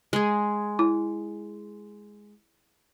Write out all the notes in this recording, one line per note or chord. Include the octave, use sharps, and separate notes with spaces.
G#3 G#4
E4